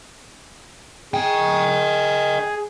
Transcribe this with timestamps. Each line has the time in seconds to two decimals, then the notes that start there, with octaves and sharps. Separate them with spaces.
1.14 G#4 D#5 G5